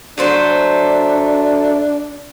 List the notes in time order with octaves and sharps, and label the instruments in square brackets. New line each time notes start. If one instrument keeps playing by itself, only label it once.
[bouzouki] F#3 A3 C5 [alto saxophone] D4